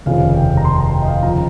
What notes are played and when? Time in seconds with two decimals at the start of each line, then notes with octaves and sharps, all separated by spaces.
0.06 F1 D#2 C#3 F3 F5
0.35 G5
0.57 A#5
0.65 C6
0.79 A#5
0.94 G5
1.02 D#5
1.08 F5
1.22 C#3 F3 A#5